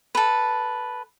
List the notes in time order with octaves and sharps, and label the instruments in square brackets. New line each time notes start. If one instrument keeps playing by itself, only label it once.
[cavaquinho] A4 B4